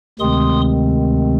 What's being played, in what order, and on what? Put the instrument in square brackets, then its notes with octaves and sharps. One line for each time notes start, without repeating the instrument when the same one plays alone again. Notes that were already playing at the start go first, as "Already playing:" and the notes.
[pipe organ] D2 C3 D#3 G#3 C4 C6 D#6